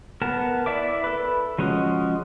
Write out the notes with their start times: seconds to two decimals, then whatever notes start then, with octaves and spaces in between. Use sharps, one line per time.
0.22 B3 A#4 A5
0.66 E4 D5 E5 D6
1.04 A4 B4
1.58 F3 G#3 C#4 F#4 D#5